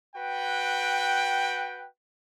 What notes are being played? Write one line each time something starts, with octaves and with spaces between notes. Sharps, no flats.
F#4 B4 G5